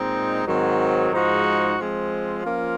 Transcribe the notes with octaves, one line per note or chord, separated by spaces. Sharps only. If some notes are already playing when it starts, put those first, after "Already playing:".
Already playing: A#2 G#3 C4 D#4
G#2 D#3 F#3 C4
G#2 F3 G#3 D#4 F#4
F3 G#3 C4
F3 A#3 C#4 F4